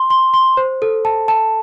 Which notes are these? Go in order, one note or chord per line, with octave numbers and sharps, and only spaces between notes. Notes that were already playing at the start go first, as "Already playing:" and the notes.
Already playing: C6
C6
C6
C5
A4
A5
A5